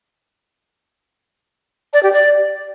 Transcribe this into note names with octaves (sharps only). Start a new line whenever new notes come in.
D5
G4
D5